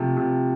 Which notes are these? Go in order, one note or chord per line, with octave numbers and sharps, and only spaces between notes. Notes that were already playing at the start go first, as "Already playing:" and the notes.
Already playing: C3 F3 A3
C3